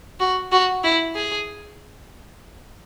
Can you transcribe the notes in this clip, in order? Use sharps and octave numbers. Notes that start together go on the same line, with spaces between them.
F#4
F#4
E4
G#4